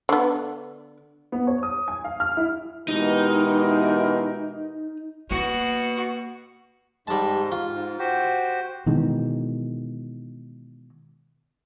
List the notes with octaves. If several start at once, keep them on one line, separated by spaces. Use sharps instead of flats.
D3 B3
B3
C#5
D#6
G#5
F5
F6
E4
B2 E3 G#3 D#4 G4 A#4
B2 A#3 F#4
G#2 G3 G#3 A5
F4
G#2
F#4 G4 C5
B2 D#3 E3 G#3